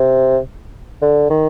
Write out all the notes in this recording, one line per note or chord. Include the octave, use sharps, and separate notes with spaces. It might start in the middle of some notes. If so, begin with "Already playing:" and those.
Already playing: C3
D3
D#3